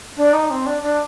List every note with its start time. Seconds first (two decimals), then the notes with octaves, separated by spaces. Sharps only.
0.17 D4
0.33 D#4
0.50 C4
0.66 D4
0.82 D4